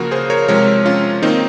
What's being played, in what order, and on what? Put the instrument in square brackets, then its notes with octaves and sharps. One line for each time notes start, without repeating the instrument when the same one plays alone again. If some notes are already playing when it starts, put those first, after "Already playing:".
Already playing: [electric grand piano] C#3 F3 A#3 F#4 A#4
G#4 C5
A#4 C#5
C3 F3 G#3 A#4 C#5
C#4 F4
D#3 A#3 C4 D#4